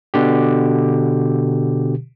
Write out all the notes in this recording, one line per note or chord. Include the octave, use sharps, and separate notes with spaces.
B2 D3 G4